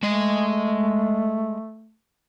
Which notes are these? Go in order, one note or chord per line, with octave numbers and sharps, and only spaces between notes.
G#3 A3 D#5